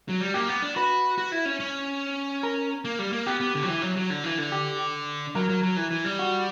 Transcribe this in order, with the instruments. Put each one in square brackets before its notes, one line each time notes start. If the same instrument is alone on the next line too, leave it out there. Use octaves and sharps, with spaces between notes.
[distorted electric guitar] F#3
G3
[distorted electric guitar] A#3 [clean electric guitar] G4
[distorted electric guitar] B3
D4
[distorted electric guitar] F#4 [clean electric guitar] B4
[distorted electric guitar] F#4
E4
C#4
C#4
[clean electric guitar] A#4
[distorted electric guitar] A#3
G3
A#3
[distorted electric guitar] B3 [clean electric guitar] G4
[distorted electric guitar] B3
D3
F#3
E3
F#3
F#3
D3
E3
D3
[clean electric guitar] G4
[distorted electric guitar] F#3 [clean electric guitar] A#4
[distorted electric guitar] F#3
F#3
E3
E3
G3
[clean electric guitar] F#4